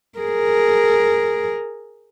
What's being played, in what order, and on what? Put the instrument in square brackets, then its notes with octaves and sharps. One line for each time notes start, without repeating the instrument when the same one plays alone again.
[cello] G#4 A#4